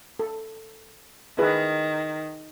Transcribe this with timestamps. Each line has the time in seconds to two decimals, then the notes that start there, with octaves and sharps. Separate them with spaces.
0.19 A4
1.38 D#3 E4 G#4 B4